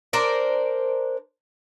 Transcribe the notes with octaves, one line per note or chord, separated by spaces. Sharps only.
D4 A#4 C5 D5